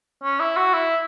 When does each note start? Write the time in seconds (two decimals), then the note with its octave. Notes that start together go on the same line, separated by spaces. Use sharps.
0.24 C#4
0.40 E4
0.57 F#4
0.74 E4